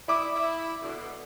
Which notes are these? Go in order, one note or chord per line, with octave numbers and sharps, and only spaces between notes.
E4 D5 D6 D#6
E4
B2 D3